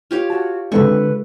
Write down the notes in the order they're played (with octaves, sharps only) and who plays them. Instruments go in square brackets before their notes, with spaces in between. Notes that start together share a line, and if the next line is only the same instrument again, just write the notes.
[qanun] F4 G4 C#5
[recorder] F#4 [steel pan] A5
[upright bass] D3 C4 [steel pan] G#3 A4 [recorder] B4 [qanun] C#6